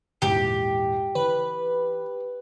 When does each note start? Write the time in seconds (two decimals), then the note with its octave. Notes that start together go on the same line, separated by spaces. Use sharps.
0.22 A#1 E2 G#2 G4
1.15 E3 B4